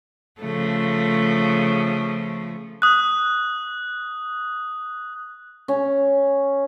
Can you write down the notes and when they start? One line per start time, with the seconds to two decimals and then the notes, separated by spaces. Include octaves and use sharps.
0.39 C#3 F3 A3
2.82 D#6 F#6
5.68 C#4